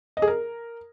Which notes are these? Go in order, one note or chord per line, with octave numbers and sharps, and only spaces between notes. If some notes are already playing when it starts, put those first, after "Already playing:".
D#5
G#4
A#4